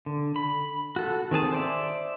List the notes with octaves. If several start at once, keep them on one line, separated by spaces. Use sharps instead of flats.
D3
B5
F#4 A4
D#3 C4 G#4 A5
C5 D5 E5